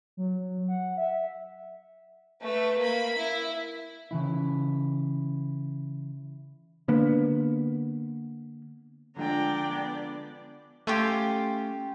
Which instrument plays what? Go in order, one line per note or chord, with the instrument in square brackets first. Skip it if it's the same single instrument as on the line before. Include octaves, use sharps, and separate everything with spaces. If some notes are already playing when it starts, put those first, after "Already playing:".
[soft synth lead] F#3
F#5
E5
[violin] A3 B4
A#3 B5
E4
[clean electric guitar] C#3 E3 E4
[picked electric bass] D3 A#3 B3
[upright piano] D3 F3 G#3 [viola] D4 D5 [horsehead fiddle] G5 A#5
[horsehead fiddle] B3
[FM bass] A3 [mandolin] C#4 F4 G4